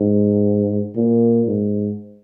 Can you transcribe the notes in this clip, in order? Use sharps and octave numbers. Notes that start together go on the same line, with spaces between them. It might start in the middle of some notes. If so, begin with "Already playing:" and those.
Already playing: G#2
A#2
G#2